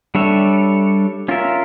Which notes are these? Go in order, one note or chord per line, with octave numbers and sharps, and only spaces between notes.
G3 D4 A4 C#5 E5
C#4 F4 A#4 E5